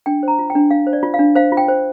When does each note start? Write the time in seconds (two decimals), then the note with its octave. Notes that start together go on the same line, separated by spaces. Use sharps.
0.06 D4 G5
0.23 C5 A#5
0.39 F4
0.50 G5
0.55 D4
0.71 D4 F5
0.87 C5
0.93 D5
1.03 F4
1.14 F5
1.19 D4
1.36 C5 F5
1.52 F4
1.57 G5
1.68 C5